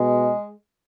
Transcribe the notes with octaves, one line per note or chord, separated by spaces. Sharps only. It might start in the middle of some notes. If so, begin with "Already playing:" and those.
Already playing: B2 G#3